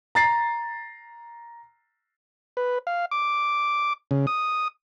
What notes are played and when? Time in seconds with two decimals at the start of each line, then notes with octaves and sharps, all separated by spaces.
0.15 A#5 A6 C7
2.57 B4
2.87 F5
3.11 D6
4.11 C#3
4.27 D#6